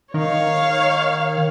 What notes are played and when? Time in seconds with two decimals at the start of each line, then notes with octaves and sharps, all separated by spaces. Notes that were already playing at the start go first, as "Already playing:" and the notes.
0.14 D#3 C#5 F5